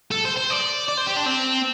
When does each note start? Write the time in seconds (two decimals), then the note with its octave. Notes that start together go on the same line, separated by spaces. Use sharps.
0.11 A4
0.25 C5
0.36 C5
0.50 D5
0.88 D5
0.97 C5
1.07 G4
1.16 D4
1.26 C4